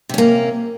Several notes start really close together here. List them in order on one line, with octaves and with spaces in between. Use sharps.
C3 C#4 A#3